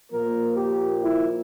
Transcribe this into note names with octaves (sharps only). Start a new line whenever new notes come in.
A#2 F3 A#3 A#4
G4
E4